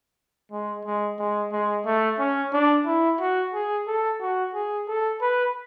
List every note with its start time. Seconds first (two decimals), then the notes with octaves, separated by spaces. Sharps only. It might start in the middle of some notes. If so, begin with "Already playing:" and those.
0.52 G#3
0.85 G#3
1.19 G#3
1.52 G#3
1.86 A3
2.19 C#4
2.53 D4
2.87 E4
3.20 F#4
3.54 G#4
3.87 A4
4.21 F#4
4.54 G#4
4.88 A4
5.21 B4